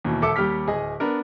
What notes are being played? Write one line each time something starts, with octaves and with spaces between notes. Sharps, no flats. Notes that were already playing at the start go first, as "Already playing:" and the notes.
D#2 B2 E3
E1 A4 E5 D6 E6 C#7
D#2 G3 G4 F6 B6
D1 G#4 D#5
B3 D4 A#4